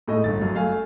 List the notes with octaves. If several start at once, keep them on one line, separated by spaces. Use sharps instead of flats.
A2 G#3 A3 D#4 D#5
G1 A6
F#2
A3 F5 G#5